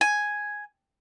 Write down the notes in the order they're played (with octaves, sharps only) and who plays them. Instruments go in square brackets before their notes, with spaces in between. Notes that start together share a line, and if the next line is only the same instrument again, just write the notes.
[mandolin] G#5